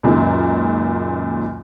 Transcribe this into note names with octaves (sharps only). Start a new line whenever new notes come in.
C#2 F#2 A#2 D#3